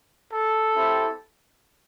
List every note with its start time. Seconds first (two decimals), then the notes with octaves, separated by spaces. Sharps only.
0.31 A4
0.75 C4 E4 G4